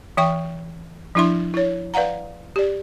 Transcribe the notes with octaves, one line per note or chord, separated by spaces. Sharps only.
E3 E5 G5 C#6
F3 D4 E4 E5 C6
E4 C#5
B4 D5 F5 F#5 A#5
G4 D5